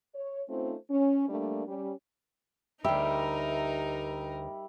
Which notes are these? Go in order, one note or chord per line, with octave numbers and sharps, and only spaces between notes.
C#5
A3 C4 C#4 D#4 F4 C5
C#4
G3 A3 A#3 D4
G3 C#4
D2 G3 D#4 G4 A#4 E5